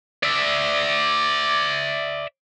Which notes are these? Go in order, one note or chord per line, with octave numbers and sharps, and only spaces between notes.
D5 E5